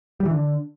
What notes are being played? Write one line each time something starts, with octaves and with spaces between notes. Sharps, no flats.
G3
E3
D3